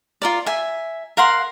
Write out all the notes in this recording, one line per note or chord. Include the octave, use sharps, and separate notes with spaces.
F4 A#4 D5
E5 G#5
A#4 F5 F#5 C6